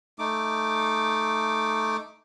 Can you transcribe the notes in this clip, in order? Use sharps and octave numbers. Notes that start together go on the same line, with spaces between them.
A3 D#4 D6